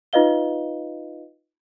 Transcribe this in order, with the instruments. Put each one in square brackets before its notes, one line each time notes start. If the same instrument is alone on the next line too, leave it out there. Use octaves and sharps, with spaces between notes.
[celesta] D#4 F4 B4 D#5 F5 G7